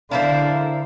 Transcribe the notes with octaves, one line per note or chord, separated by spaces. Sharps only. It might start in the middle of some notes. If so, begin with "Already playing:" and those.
D3 C4 D4 E4 A#4 F5